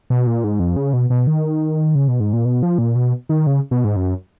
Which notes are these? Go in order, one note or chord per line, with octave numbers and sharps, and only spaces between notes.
B2
A#2
G#2
F2
C#3
B2
B2
D#3
C#3
B2
G#2
A#2
B2
F3
A#2
B2
D#3
C#3
B2
G#2
F#2